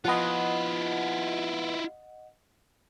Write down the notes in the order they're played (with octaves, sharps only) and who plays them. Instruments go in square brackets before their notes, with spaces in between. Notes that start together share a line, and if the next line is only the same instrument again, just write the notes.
[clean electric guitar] F3 B3 [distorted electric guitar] E4 F4 [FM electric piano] D#5 F#5